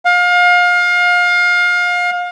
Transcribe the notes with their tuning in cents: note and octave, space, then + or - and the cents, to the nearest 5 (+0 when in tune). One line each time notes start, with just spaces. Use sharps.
F5 +30